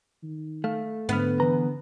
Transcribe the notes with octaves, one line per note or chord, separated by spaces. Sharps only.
D#3
A3 F5
G#2 D3 B3 F6
E3 B4 A#5